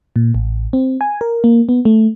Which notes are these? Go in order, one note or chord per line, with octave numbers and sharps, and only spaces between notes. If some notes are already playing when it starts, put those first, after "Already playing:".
A#2
A1
C4
G#5
A#4
A#3
B3
A3